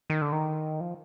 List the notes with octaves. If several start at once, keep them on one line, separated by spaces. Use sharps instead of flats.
D#3
D3
D#3
F3